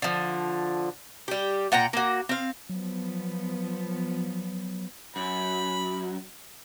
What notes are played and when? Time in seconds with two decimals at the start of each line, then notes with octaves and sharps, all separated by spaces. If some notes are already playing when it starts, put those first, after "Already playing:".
0.02 D3 F3
1.28 G3 G4
1.72 A#2 F#5 G5 A#5
1.93 A#3 F#4
2.29 C4 F5
2.69 F3 F#3 B3
5.16 F#2 B5